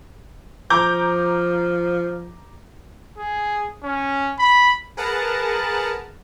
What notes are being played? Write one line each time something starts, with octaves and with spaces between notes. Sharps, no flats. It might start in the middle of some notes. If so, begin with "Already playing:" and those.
F3 A#5 D6 G6
G#4
C#4
B5
G#4 A#4 B4 F#5 A5 A#5